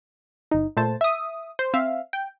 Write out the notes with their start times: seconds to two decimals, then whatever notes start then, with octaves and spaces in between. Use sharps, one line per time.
0.51 G1 D#4
0.77 A#2 A3 C5 A5
1.01 E5 D#6
1.59 C5
1.74 C4 E5 F5
2.13 G5